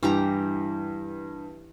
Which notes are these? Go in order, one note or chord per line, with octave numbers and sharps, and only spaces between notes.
G2 E3 G4 A#5